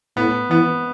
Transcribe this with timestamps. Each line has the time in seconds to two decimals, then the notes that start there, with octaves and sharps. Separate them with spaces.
0.17 A2 B3
0.50 E3 B3